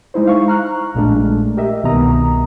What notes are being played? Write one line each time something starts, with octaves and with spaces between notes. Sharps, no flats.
G#3 D#4 E4 C5
F5 C#6
A#5 F6 F#6
A#1 A#2 G#3 A3 D4
G4 A#4 D#5 E5
C2 B2 D#3 B3 A#5 D#6